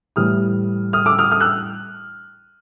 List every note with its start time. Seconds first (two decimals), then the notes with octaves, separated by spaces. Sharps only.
0.16 A2 E3 G3 D#6 F6
0.93 D#6 F6
1.06 D6 E6
1.19 D#6 F6
1.31 D#6 F6
1.41 E6 F#6